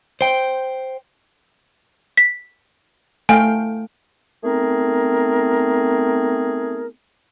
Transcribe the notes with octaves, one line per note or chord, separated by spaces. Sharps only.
C5 G5
B6
A3 F5 G5 G#5
A3 B3 C4 D#4 G#4 A#4